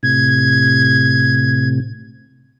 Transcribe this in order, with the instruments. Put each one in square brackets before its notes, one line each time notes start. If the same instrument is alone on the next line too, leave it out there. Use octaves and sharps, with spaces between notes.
[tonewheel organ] A2 C3 [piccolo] G#6